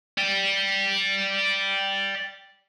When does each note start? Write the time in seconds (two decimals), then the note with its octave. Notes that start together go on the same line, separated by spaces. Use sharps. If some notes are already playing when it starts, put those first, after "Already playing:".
0.18 D5 G5